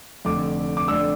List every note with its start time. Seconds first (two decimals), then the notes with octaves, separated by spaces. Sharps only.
0.25 F1 F2 D3 A3 D4 D6
0.77 D6
0.88 F2 D3 A3 D4 E6